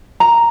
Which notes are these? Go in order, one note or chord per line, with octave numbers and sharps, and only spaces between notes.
A#5